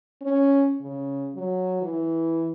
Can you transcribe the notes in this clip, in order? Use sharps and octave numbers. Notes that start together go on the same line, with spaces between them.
C#4
C#3
F#3
E3